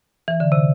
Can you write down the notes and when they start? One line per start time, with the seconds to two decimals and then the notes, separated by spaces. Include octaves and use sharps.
0.28 E3
0.40 D3
0.52 C3